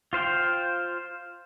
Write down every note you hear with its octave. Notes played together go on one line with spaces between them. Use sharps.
F4 C5 F5 G5